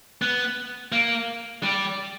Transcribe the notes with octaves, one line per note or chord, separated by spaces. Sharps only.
B3
A#3
G3